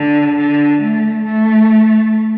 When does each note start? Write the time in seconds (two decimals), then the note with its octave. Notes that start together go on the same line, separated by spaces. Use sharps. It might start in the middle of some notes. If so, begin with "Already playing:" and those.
Already playing: D3
0.35 D3
0.80 A3
1.25 A3